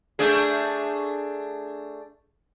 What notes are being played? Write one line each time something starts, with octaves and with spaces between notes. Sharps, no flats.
A3 D4 G#4